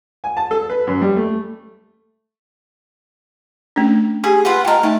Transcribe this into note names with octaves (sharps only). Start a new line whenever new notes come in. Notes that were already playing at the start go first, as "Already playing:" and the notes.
G#5
A5
A4
B4
F#2
G3
A3
A3 C#4 D4
G4 G#4
F4 B4 F#5
A#4 D#5 G5 A5
A3 D#4 E5 A5